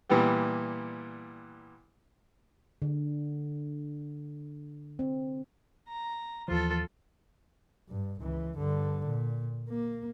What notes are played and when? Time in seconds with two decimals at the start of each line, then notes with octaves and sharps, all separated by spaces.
0.09 A#2 E3 G3 B3 G4
2.82 D3
4.99 C4
5.88 A#5
6.48 D#2 E3 F3 F4 A4
7.89 G2
8.21 C#2 E3
8.57 G2 D3
9.05 A#2
9.69 A#3